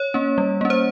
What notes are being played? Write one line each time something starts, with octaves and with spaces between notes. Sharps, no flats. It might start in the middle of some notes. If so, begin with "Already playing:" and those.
Already playing: C#5
A#3 C#4
G3
A#3 C#4
C5